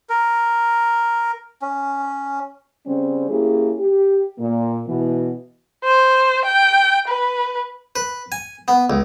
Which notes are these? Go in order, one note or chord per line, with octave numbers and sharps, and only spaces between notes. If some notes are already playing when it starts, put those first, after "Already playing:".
A#4
C#4
C#3 G3 C4 C#4
A#3 C#4 E4 G4 G#4
G4
A#2 A#3
B2 E3 B3
C5
G5
B4
B4
G#5
B3
C#2